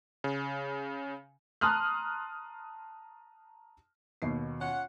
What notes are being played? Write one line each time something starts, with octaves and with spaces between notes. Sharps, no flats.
C#3
A5 A#5 C6 D#6 F6 F#6
D#2 B2 C7
C#4 F4 F#5